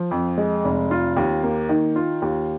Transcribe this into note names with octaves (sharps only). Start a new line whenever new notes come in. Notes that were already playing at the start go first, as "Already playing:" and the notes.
Already playing: F3
F2
G#3
F1
F4
D#2
A#3
D#3
F4
D#2